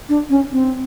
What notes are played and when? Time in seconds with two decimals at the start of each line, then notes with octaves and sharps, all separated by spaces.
0.09 D4
0.30 C#4
0.52 C4